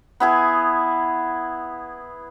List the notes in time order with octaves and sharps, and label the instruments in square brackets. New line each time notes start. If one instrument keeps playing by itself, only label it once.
[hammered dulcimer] B3 E4 G#4